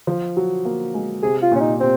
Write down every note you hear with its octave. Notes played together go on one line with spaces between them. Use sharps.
F3
F#3
A#3
G#3
C3 G#4
F4
A#2
C#4
D#4
C3 C4